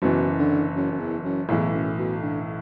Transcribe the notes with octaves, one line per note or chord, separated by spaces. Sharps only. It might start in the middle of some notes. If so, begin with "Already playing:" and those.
F#1 F#2 B2 E3
D3
F#2
F#2
E2
F#2
B1 E2 A2 E3
F#2
B2
D3